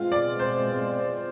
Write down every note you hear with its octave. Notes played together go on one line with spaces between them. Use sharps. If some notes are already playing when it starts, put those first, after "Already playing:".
Already playing: B2 G#3 C4 F4
D5
C5